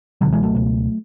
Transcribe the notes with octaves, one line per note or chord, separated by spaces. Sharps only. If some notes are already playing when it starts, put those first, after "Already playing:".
B2 D3 F#3
C#2
E3 G#3
F#3 A3
C#2 B2